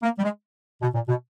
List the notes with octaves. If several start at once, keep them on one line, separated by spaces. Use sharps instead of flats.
A#3
G3
G#3
B2
A#2
B2